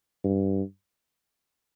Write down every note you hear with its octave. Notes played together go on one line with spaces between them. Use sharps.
G2